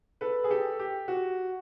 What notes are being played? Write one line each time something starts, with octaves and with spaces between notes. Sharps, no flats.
A4 B4
G#4
G4 A4
G4
F#4